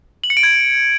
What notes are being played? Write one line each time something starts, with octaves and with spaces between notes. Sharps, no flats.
F#7
C#7
D7
G#6